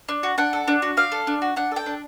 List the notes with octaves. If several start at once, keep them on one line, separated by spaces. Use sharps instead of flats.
D4
F#4
D4 F#5
A4
D4
F#4
D4 F5
A4
D4
F#4
D4 F#5
A4 G5
D4